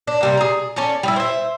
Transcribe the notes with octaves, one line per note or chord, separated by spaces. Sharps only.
D4
C3 G3 A#3
G#4 A#5
C#4 A4 C#5 D5
G3 D#4 E4
C5 E5